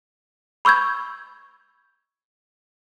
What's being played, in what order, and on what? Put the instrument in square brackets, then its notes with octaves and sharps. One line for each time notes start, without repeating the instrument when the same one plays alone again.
[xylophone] B5 C#6 E6 G6 G#6